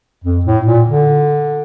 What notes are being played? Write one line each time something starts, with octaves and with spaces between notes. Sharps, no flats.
F2
A2
A#2
D3